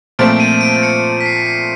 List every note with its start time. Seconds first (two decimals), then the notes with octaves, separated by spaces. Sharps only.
0.19 A#2 F3 A3 C4 D7
0.40 D#7
0.61 D7
0.83 C#7
1.20 B6
1.26 C7
1.46 C7